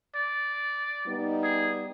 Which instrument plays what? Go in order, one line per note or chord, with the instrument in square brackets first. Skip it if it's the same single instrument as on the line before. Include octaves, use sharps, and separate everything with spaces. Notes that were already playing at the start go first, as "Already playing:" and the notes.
[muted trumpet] D5
[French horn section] G3 B3 D#4
[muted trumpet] G#4